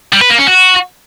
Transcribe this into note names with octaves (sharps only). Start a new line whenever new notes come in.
G3
B4
A#3
C#4
F#4